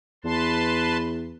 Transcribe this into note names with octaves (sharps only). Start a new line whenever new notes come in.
E2 B4 A5 C6